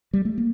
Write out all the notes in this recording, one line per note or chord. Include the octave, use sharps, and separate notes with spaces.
G3
A3
A#3